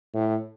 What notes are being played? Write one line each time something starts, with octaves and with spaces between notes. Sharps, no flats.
A2